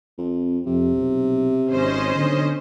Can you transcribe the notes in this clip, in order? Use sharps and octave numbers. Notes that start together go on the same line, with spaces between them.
F2 C4
F2 C3
B1
G#1 C#4 C5 D#5
B1 D3